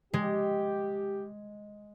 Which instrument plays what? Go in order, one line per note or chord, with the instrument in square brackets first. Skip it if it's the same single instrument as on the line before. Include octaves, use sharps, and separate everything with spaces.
[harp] G#3 [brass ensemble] G4